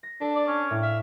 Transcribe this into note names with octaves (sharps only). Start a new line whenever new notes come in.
A#6
D4 A4
D5
C#4
A2
E5 F5